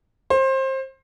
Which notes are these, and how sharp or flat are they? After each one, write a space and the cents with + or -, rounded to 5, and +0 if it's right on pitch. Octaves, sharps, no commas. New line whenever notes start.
C5 +25